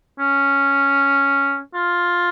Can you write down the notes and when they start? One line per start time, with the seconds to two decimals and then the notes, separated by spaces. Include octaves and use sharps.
0.19 C#4
1.74 F4